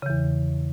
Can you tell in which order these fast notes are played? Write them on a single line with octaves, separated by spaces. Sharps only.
C#3 E3 E2